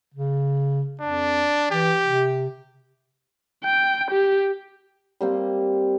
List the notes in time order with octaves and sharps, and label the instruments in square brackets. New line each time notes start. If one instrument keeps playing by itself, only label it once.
[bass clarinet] C#3
[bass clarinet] F2 [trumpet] D4
[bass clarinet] E3 [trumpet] G4
[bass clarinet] C3
[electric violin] G5
G4
[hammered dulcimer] G3 A#3 C4